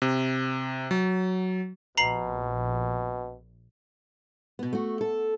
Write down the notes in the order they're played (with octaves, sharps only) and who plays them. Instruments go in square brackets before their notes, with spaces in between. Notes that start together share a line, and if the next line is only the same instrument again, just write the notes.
[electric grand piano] C3
F#3
[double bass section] A#1 [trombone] B2 [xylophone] A#5 C7 F#7
[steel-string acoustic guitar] B2 B3
A3 F#4
A4